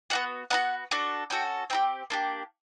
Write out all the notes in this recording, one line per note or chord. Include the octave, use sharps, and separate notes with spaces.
B3 D#4 F#4 F#5
B3 D#4 F#4 F#5
D4 F#4 A4
C#4 F#4 A4 G5
C4 D#4 G4 G5
A#3 D4 G4